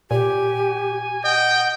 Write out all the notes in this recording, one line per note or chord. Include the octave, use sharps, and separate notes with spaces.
A#2 G4 G#5
D#5 F#5 G5